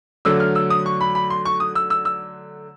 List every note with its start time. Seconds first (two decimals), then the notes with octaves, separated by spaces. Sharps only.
0.25 D3 F#3 A3 E6
0.40 F6
0.55 E6
0.70 D#6
0.86 C#6
1.01 B5
1.15 B5
1.30 C6
1.45 C#6
1.60 D#6
1.75 E6
1.90 E6
2.05 E6